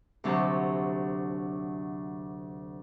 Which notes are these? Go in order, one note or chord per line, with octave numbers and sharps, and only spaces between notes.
D2 C3 F#3 A5